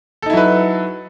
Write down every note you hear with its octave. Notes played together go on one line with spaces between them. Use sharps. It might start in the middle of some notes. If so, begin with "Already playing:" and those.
F#3 D#4 E4 A4 B4